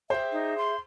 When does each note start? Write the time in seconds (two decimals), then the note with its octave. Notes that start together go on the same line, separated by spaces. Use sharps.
0.10 G4 G#4 C5 E5
0.32 D#4
0.57 C6